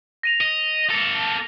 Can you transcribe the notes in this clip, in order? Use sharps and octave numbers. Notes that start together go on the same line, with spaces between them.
A#6 D#7 F7
D#5
A#3 A4